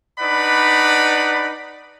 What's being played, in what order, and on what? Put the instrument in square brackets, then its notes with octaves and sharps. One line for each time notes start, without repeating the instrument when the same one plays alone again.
[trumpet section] D4 D#4 B4 D5 F#5 B5